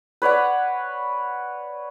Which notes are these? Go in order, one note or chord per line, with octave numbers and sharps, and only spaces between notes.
B4 C#5 D5 F#5